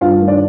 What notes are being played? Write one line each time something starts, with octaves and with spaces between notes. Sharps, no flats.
G2 F4 F5
D#3
D4 D5